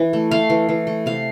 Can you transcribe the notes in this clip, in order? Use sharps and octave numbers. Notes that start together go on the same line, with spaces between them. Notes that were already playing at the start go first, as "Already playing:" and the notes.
Already playing: E3
A3
A3 F5
E3
E3
A3
C3 F5